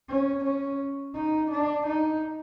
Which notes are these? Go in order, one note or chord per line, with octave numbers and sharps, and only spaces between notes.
C#4
C#4
D#4
D4
D#4